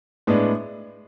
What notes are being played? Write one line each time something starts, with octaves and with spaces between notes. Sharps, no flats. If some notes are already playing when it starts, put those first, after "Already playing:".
A2 G#3 B3 D4